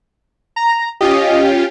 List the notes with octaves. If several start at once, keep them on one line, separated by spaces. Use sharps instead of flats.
A#5
C#4 F4 G4 D#5